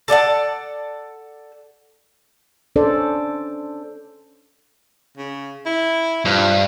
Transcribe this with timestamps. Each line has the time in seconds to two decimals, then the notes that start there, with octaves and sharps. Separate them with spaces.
0.08 A4 D5 D#5 F#5
2.76 C#4 D4 A4 C5 D5
5.17 C#3
5.66 E4
6.25 G2 F3